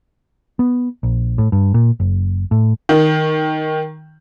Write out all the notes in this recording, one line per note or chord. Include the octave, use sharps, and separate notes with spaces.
B3
A#1
A2
G2
A#2
F#1
A2
D#3